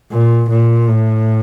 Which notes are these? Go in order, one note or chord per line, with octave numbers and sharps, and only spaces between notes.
A#2
A#2
A2